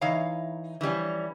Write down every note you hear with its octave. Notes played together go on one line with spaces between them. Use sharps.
E3 D#4 C#5 F5 A#5
E3 F3 G3 C#4